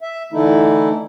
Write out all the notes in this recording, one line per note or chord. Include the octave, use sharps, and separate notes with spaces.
E5
D3 E3 A3 D#4 E4